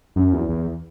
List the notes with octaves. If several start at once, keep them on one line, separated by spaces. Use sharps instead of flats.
F#2
E2
E2